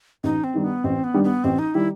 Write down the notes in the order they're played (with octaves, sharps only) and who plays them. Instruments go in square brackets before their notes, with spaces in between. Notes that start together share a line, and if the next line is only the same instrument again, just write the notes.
[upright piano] A1 [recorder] D#4
[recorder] C4
[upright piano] G2 D#3 G3
[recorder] B3
[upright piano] A1 [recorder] C4
[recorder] B3
[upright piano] G2 D#3 G3
[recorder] B3
[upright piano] A1 [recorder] C4
[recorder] D#4
[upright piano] D#3 G3 [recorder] E4